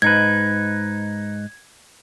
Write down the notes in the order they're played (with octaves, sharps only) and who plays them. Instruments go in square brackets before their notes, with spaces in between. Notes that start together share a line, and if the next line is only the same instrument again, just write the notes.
[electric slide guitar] G#2 D#4 B4 [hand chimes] G#6